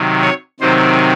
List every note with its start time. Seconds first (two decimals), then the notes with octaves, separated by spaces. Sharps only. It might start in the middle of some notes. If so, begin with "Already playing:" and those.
Already playing: C3 D#3 F#3
0.22 C#5
0.60 C3 D#3 F#3 C4 C5